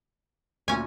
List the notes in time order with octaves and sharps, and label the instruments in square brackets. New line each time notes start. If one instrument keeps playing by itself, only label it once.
[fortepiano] D2 A#2 [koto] C#4 G#5